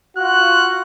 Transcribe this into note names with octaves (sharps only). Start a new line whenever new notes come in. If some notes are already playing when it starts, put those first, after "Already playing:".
F4 F#4 F#6